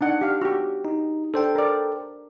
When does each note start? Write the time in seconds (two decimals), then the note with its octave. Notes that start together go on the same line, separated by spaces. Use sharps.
0.01 D4 D#4 F#5
0.21 G4 F5 D6
0.41 F#4 G4
0.85 D#4
1.34 D4 A4 C5 G5
1.55 A#4 D5